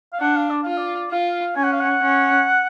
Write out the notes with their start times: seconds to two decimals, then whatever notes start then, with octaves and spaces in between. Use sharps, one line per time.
0.13 F5
0.20 D4 F#5
0.36 F5
0.50 D5
0.63 F4 F5
0.77 D5
1.11 F4 F5
1.56 C#4 G#5
1.64 F#5
1.72 F5
1.80 F#5
2.01 C#4